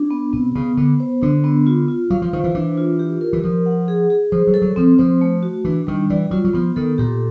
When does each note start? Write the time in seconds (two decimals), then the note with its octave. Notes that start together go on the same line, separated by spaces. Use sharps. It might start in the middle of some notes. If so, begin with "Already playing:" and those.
Already playing: D4
0.11 B3
0.33 C3 B3
0.55 C#3 B3
0.77 D3 B3
1.00 C5
1.22 D3 D4
1.44 B3
1.67 F4
1.88 F4
2.10 F#3 F5
2.22 F3
2.33 D#3 C5
2.44 E3
2.55 E3 D4
2.77 F4
2.99 G4
3.21 A#4
3.33 E3
3.44 F3 A#4
3.66 F#5
3.88 G#4
4.10 G#4
4.32 F3 C5
4.47 F#3
4.54 A4
4.62 F#3
4.76 F3 C4
4.99 F3 C5
5.21 A3
5.43 F#4
5.65 E3 D4
5.87 D#3 G3
6.10 E3 D5
6.31 F#3 F4
6.45 F#3
6.53 F3 B3
6.76 D#3 A4
6.98 A#2 G4